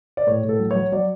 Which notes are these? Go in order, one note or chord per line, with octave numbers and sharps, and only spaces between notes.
D5
A2 C#5
A2
A4
F#3
F#3 C#5
F#3 D5